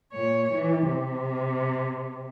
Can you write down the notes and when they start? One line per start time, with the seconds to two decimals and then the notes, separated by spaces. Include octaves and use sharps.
0.14 A#2 C#5
0.52 E3
0.87 C3